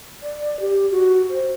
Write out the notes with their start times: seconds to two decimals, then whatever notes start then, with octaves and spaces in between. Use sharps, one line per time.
0.23 D5
0.60 G4
0.91 F#4
1.30 C5